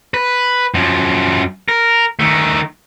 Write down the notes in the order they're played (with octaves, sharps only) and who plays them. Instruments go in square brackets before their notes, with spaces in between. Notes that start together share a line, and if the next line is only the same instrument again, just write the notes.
[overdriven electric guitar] B4
F#2 F3
A#4
D#3 A3